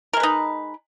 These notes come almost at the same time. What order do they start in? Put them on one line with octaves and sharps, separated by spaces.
A#4 G#3 B4 D#4